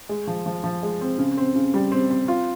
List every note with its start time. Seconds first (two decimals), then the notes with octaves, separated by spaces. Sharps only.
0.09 G#3
0.27 F3
0.46 F3
0.64 F3
0.83 G#3
1.01 C4
1.18 C#3
1.37 C4
1.56 C#3
1.74 G3
1.92 C4
2.10 C4
2.28 F4